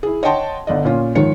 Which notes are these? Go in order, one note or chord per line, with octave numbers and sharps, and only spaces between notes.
E4 G#4
C#5 D#5 F#5 G5 A5 C6
G1 D3 D5 D#5
A#2 C#4 F4
G#2 D#3 F3 C#5 C#7